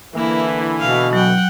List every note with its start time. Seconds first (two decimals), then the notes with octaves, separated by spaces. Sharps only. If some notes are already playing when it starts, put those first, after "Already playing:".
0.15 D3 E3 A#3 E4
0.80 B2 F5
1.13 F#3 F#5 G5